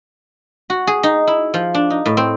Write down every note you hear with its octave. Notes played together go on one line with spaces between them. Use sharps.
F#4
G#4
D#4
E4
F3
D4
D#4
A2
C4